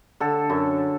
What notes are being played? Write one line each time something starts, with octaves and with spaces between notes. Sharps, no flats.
D3 A4
F#2